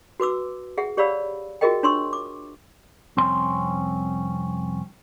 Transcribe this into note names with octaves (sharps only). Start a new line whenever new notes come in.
F#4 B4 D6 E6
G#4 E5 F#5
G4 C#5 D5 F5 B5 E6
F4 F#4 G#4 A#4 D#5 G5
D4 C#5 C6 C#6 E6
D6
C2 F2 C4 C#4 C6